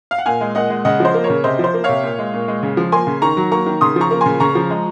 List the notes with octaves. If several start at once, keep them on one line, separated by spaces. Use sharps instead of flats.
F5
F#5
A#2 F5 G#5
G#3
A#2 D#5 F#5
G#3
C#3 D#5 F#5
F3 C5 D#5
A#3
A#4 C#5
C#3
C3 C5 D#5
F3 C5
A#3
C3 C#5 F5
A#2
G#3
A#2
G#3
C#3
F3
A#3 G#5 C6
C#3
D#3 A#5 C#6
F#3
A#3 A#5 C#6
D#3
C#3 C6 D#6
F3 A#5 C#6
A#3
C#3 G#5 C6
C#3 A#5 C#6
F3
G#3